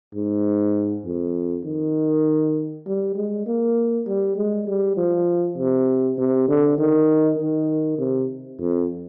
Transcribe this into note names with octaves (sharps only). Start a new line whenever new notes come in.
G#2
F2
D#3
G3
G#3
A#3
G3
G#3
G3
F3
C3
C3
D3
D#3
D#3
C3
F2